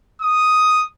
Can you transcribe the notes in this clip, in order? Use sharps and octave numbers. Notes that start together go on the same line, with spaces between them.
D#6